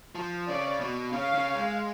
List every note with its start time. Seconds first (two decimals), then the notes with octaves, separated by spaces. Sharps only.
0.15 F3
0.48 C#3 D5
0.80 B2
1.12 C#3 F5
1.35 C#3
1.55 G#3